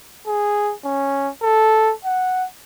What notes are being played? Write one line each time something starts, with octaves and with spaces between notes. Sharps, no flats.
G#4
C#4
A4
F#5